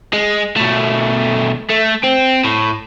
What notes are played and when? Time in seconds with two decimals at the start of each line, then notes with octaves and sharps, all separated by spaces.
0.13 G#3
0.57 B2 A3
1.70 A3
2.04 C4
2.44 A2